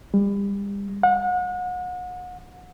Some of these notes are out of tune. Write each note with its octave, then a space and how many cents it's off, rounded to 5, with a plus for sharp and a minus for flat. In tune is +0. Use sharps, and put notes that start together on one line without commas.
G3 +35
F#5 -35